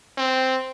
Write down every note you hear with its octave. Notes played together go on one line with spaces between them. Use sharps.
C4